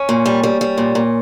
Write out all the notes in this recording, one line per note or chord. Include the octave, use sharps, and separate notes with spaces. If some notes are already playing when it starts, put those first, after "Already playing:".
Already playing: C#4
A#2
G3
G3
G3
A#2
A#2